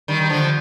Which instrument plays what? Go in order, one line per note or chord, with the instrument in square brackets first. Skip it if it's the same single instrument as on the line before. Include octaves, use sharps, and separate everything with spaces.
[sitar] D#3 G3
G3
D3 F3